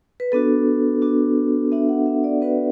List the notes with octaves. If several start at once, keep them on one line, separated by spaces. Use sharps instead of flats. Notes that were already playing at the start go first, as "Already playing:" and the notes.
B4
B3 D4 F#4 A4
B3 D4 F#4
B3 D4 F#4 E5
F#5
E5
D5
B3 D4 F#4 B4